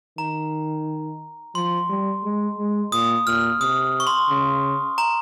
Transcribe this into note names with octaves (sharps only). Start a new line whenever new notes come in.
D#3 A#5
F3 C6
G3
G#3
G#3
A#2 D#6
A#2 F6
C3 D#6
C#6
C6
C#3
A#5